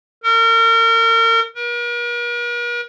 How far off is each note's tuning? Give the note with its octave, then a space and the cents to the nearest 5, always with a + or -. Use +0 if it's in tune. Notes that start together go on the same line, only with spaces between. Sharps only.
A#4 -35
A#4 +45